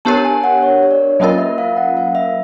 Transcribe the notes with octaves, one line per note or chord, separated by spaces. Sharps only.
B3 D4 G4 A#4 C#5 A5
G#5
F#5
C#5
C#5
D5
F#3 A#3 C#4 F4 A#4 D#5
E5
F5
F#5
F5
E5